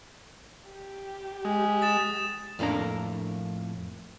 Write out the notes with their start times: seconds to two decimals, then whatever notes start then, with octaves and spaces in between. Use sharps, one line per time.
0.70 G4
1.45 G#3
1.81 D#6 A6 E7
2.59 F2 A2 A#3 D4 A#5